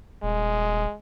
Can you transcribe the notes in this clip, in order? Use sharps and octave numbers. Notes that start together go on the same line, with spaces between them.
D#1 G#3